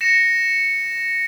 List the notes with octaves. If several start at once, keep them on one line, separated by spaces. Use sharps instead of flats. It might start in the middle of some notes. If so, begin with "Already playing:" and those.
A#6 C#7 E7